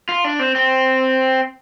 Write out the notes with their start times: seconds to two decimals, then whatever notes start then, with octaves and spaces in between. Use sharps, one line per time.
0.09 F4
0.24 D4
0.39 C4
0.55 C4